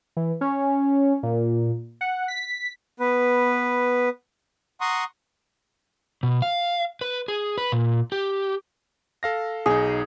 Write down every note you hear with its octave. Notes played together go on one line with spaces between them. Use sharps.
E3
C#4
A#2
F#5
B6
B3 B4
F#5 A#5 C6 C#6 D#6
B2
F5
B4
G#4
B4
A#2
G4
A4 F5 A#6
B1 D#4 G#4